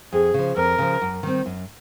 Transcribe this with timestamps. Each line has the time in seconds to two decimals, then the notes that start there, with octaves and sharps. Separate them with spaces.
0.13 F2 G#4
0.34 C#3 F3
0.57 F2 A#4
0.78 C#3 F3
1.02 F#2
1.23 D#3 G3 C4
1.46 F#2